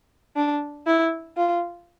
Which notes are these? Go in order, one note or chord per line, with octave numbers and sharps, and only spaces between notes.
D4
E4
F4